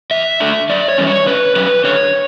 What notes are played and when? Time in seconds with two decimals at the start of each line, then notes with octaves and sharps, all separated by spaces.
0.11 E2 E5
0.40 D3 A3 D4
0.69 F#2 D5
0.88 C#5
0.98 E3 G3 C#4
1.07 C#5
1.26 D3 B4
1.56 F#3 C#4 B4
1.84 D3 C#5